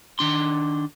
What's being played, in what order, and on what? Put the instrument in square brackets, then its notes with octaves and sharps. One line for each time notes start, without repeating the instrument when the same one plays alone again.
[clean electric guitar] D#3 D4 C6